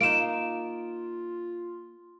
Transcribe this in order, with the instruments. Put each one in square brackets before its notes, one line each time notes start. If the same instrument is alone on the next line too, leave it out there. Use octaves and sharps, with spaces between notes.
[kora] A#3 D#4 [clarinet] F4 [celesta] D7 E7